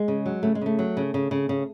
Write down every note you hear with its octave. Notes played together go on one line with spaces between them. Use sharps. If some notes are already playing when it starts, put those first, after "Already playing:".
Already playing: G#3
C#3
F#3
C#3 A3
G#3
C#3 A3
F#3
C#3
C#3
C#3
C#3